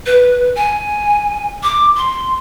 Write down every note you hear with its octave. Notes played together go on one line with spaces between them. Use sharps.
B4
G#5
D6
C6